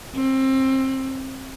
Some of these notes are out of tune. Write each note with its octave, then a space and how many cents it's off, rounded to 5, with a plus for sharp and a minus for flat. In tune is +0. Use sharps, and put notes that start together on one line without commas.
C4 +25